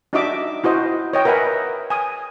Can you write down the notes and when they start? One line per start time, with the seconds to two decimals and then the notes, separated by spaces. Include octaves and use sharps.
0.13 D4 D#4 F#4 D#5 E5 D6
0.64 E4 F#4 C5 D#5
1.13 C#5 D#5 G5
1.25 A#4 B4 E5 F#5 G#5 A#5
1.90 G#5 D#6